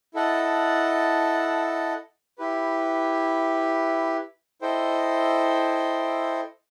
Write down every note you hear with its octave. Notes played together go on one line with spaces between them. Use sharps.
E4 A4 D#5 F#5 A5
E4 G4 B4
E4 A4 C5 D#5 G5